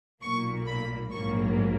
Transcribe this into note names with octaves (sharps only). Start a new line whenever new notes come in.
B1 A#2 A#3 C#6
B5
A#1 G#2 F#3 A#3 C#6